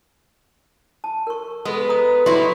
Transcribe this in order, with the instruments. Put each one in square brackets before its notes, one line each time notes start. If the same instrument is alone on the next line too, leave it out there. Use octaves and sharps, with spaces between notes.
[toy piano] A5
A#4 C#6
[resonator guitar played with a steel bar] G#3 [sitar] B3 [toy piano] A4 D#6
[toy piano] C5 A#5 D#6
[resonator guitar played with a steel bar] F#3 E4 [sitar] G3 [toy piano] C6